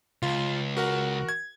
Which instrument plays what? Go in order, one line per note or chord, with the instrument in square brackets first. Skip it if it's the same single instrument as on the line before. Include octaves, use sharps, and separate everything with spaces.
[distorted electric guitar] C#2 [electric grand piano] F4
[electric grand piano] F#4 A#4 F#5
G#6